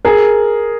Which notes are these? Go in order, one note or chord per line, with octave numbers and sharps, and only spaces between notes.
G#4 A#4